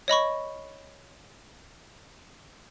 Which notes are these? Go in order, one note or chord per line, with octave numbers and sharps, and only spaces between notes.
C#5 D#5 B5 C#6